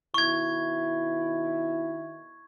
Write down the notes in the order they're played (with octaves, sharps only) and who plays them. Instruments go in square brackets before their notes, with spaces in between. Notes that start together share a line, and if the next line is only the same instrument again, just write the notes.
[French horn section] B2 D#3 E4 [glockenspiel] C#6 G#6